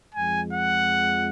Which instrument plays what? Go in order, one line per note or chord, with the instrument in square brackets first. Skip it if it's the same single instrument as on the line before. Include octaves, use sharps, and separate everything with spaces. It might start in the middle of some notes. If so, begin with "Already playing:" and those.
[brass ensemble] F2 F3 G#3 [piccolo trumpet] G#5
[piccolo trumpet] F#5